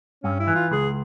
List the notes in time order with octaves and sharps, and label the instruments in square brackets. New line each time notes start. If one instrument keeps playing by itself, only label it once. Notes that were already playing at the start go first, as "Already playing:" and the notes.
[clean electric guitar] G2 [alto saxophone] C#4
[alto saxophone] E4
[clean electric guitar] E3
[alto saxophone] F4
[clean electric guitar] C#2 [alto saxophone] G#4